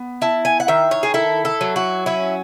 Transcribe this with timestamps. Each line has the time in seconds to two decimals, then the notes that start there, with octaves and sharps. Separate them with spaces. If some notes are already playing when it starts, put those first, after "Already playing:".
Already playing: B3
0.22 E4 A5
0.45 G#5
0.60 F#5
0.68 D#3 E5
0.91 C#5
1.03 G#4
1.14 E4 A4
1.45 A4
1.61 F#3
1.76 F#4
2.06 C#4 E4